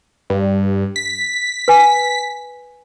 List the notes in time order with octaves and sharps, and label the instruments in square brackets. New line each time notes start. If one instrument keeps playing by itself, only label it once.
[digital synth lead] G2
B6
[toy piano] B4 G#5